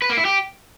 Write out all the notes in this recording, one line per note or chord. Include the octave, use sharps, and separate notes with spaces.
B4
A#3
E4
G4